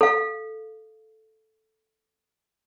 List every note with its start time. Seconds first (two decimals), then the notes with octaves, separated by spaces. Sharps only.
0.01 A4 F5